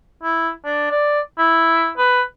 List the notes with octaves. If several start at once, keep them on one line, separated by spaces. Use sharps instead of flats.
E4
D4
D5
E4
B4